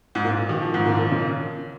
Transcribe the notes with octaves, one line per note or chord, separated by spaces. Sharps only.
G#2
A#2
D#3
F3
G#2
A#2
A#2
C#3